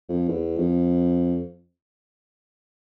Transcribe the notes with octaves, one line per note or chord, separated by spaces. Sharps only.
F2
E2
F2